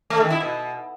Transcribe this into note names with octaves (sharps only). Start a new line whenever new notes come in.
A3
D#3
E4
B2